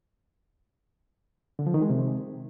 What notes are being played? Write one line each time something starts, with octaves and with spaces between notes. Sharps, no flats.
D3
F3
D#3
G#3
C3